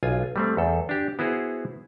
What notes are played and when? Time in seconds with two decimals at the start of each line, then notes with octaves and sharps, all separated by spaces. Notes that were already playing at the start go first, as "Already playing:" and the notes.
0.03 B1 F4 G#5
0.36 G3 A3 C4
0.57 E2 A4
0.89 D4 G4
1.19 B3 E4 F#4 G#4 C5